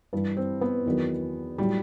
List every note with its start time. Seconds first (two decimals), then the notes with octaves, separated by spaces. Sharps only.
0.13 G2 E3 G3
0.37 C4
0.61 B3
0.85 E2 D#3 F#3
1.58 A2 F#3 G3